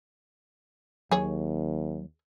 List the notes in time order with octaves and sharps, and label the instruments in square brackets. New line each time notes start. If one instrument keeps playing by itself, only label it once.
[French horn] D#2 [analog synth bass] F#3 [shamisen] G#4 C#5